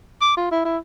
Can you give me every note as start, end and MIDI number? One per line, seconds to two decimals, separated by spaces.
0.21 0.35 86
0.37 0.51 65
0.52 0.60 64
0.65 0.77 64